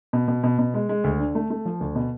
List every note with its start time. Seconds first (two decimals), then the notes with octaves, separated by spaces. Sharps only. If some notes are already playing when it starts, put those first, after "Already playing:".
0.13 B2
0.28 B2
0.43 B2
0.59 B2
0.74 G#3
0.89 G#3
1.04 D2
1.19 D3
1.35 A3
1.50 A3
1.65 F3
1.81 D2
1.95 B2